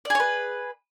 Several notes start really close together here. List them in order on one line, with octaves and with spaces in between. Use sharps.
D5 G#4 C#5 B4